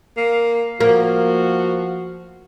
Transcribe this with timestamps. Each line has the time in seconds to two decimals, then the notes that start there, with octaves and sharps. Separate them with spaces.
0.17 A#3
0.80 F3 A#3 F#4